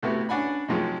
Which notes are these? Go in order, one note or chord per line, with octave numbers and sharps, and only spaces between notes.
A2 C3 B3 E4 F#4 G4
C#4 D4 F#5 G#5 B5
G#2 C3 F3 F#3 G#3